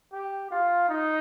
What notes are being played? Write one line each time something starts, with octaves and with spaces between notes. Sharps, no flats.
G4
F4
D#4